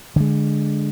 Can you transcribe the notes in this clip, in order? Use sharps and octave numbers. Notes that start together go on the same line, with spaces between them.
D3 G#3